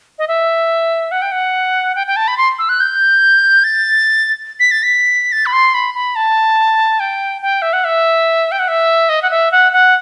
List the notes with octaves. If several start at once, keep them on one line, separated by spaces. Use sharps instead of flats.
D#5
E5
F#5
G5
F#5
G5
G5
A5
B5
C6
E6
F#6
G6
A6
B6
A6
B6
A6
B5
C6
B5
B5
A5
G5
G5
E5
F#5
E5
G5
F#5
E5
D#5
F#5
E5
F#5
F#5